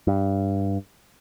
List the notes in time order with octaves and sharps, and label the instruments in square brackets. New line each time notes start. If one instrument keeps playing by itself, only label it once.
[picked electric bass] G2